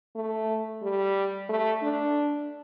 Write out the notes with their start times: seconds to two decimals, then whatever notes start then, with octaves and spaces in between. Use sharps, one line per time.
0.16 A3
0.82 G3
1.49 A3
1.82 D4